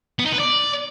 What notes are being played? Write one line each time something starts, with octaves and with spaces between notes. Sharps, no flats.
B3
D#4
B4
D5